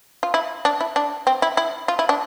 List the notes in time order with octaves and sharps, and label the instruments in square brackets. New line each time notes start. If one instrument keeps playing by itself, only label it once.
[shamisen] F4
E4
D4
E4
D4
C4
E4
E4
F4
E4
D4